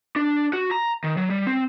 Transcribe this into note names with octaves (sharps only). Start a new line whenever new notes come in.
D4
F#4
A#5
D#3
F#3
G3
C4